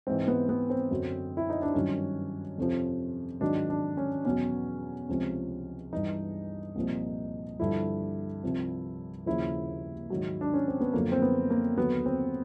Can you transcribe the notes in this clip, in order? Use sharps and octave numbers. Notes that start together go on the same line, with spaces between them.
G#2 E3 C4
B3
B3
C4
F#2 D3 F#3
E4
D#4
D4
G2 D#3 F#3 C#4
F2 C3 F3
G#2 D#3 F#3 D4
D4
C#4
E2 B2 F#3 C#4
C#2 C3 F3
G2 E3 D#4
C2 A#2 F3
G2 D3 F3 E4
C2 C3 F3
D#2 C#3 F3 E4
G#2 D#3 F#3
D4
C#4
C4
B3
F#2 D3 F3 A#3
C4
B3
A#3
D#2 D3 F#3 B3
C4